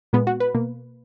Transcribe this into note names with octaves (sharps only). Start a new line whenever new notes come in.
A#2 G#3 B3
F#4
B4
B2 A#3